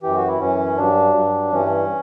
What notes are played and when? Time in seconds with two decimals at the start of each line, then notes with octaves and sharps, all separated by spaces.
0.03 F#2 E3 G4
0.16 F#4
0.28 E4
0.40 F#2 E3 C#4
0.77 G2 F#3 D4
1.14 G2 F#3
1.51 G2 E3 C#4